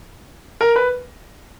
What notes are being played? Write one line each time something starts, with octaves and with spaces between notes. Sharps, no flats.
A#4
B4